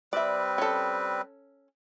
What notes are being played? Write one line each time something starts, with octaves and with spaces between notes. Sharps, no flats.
G3 C4 B4 D5 E5
C#4 A4